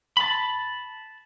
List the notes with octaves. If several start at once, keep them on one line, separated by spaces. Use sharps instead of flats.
A5 B5